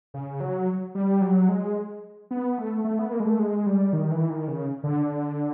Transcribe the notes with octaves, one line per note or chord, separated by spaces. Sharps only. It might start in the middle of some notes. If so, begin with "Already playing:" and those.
C#3
F#3
G3
F#3
G#3
B3
A3
A3
B3
A#3
G#3
A3
G#3
G3
D#3
E3
D#3
C#3
D3